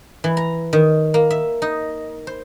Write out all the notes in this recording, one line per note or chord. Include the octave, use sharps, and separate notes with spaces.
E3
A#5
D#3
A#3
E5
D#4
C5